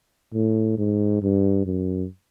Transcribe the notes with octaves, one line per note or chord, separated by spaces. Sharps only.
A2
G#2
G2
F#2